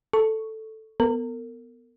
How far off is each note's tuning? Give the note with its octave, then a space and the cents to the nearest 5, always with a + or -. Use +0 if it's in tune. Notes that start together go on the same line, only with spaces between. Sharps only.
A4 +0 C#6 +0
B3 +0 A#4 -40